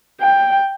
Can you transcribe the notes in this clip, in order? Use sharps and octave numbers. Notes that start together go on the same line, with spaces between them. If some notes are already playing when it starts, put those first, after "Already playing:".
G5